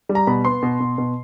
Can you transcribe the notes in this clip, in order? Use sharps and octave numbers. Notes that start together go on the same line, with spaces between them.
G3
A#5
B2 B5
B3 C6
B2
B2
B2